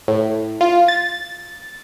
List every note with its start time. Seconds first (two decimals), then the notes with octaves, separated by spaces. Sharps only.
0.08 A2
0.61 F4
0.88 A6